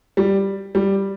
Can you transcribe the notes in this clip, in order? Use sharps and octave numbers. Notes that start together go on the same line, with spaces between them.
G3
G3